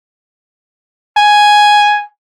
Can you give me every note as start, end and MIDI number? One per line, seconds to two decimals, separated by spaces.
1.17 2.05 80